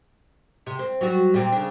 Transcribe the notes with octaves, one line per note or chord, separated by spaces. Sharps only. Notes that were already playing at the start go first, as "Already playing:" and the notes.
C3
C4
F#3 G3 F#4
A#2 G3 C4
C#3 D4